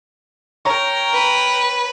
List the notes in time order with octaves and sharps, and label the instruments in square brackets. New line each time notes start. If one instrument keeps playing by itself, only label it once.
[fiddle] A#4 G5 [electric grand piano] C#5 A#5 C#6
[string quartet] B4